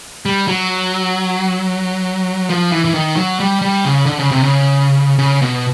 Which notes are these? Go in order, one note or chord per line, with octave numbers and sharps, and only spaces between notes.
G3
F#3
F3
E3
E3
D#3
F#3
G3
G3
C#3
D3
C#3
C3
C#3
C#3
B2